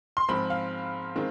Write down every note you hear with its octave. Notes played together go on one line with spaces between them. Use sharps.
C6
G#2 F3 G#3 C4 B5
F5
D#3 G#3 C4